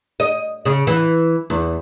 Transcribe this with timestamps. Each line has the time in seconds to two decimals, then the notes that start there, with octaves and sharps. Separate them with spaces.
0.20 D#5
0.65 C#3
0.87 E3
1.50 E2